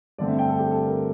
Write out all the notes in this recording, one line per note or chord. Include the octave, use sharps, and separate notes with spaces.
G2 D3 A3 C4 D5
E5
G5
A4
G4
A4
A#4